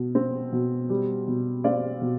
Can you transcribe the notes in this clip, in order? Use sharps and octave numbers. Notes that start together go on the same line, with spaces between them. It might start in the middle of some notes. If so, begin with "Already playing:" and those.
Already playing: B2
C4
B2
G3
B2
C4 D5 F5
B2